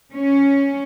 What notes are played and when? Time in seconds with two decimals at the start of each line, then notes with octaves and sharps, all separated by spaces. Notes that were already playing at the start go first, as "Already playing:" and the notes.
0.12 C#4